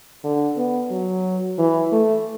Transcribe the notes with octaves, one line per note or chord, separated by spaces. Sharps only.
D3
B3
F#3
E3
A3